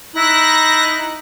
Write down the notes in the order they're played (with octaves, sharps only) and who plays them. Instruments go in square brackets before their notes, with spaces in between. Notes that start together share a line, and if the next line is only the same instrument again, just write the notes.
[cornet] D#4 [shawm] E4 [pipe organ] F#6 A#6